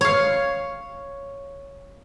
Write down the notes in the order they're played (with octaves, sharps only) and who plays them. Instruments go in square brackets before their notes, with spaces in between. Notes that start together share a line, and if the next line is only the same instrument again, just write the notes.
[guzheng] C#5 F5